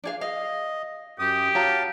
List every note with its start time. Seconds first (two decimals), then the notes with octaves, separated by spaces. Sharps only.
0.04 D4 G#4 F5
0.21 D#5 F5
1.19 F#2 G4 D#6
1.55 F#4 C#5 F5 A5 A#5